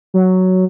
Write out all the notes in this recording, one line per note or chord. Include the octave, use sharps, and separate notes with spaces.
F#3